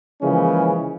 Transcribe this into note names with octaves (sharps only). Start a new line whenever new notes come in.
C#3 E3 F3 G#3 A#3 C#4